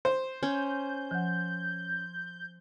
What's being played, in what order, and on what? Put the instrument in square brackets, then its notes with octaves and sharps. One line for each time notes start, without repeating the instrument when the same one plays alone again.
[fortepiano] C5
[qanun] C#4 [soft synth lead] G6
[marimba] F3 F#5